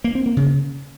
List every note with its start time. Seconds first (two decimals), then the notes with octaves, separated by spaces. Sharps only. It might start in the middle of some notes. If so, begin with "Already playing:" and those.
0.04 A#3
0.15 C4
0.26 A#3
0.37 C#3